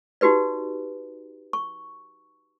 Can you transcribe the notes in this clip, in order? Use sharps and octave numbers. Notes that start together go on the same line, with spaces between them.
D#4 F#4 G4 B4 D5
C#6